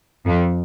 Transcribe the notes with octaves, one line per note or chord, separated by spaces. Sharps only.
F2